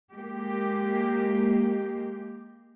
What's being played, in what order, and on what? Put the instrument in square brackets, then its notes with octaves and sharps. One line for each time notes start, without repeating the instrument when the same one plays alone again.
[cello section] G#3 A#3 G4